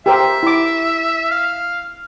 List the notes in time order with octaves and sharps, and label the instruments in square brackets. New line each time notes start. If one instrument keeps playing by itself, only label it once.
[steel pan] G4 A#4 C5 [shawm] E5
[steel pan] E4 D6
[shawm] F5